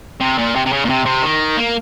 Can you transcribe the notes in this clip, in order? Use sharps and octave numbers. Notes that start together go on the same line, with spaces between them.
C3
A#2
C3
C3
C#3
A#2
C3
C3
D#3
A#3